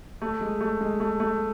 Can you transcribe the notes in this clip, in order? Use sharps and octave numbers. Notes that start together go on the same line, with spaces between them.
A3
G#3
A3
G#3
A3
A3